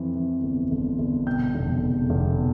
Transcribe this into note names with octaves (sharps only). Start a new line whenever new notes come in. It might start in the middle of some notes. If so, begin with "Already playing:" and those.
Already playing: F2 E3
E3
G1
G1
G1
B2 G5 G6
F1
E2
F1
B2